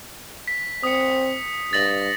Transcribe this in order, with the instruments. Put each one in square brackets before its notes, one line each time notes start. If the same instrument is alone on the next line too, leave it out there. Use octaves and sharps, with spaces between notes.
[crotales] B6
[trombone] C4 [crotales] D#6 C#7
[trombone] G2 [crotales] A6 A#6 F#7